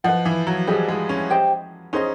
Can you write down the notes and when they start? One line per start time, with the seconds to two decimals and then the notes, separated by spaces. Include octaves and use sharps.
0.04 F3 B4 D#5 F#5
0.26 E3
0.47 F#3
0.67 G3 G#4 C5 D#5 G#5
0.88 G#3
1.09 C#4
1.30 G4 C5 D#5 G5
1.93 C#4 D#4 G#4 C5 D#5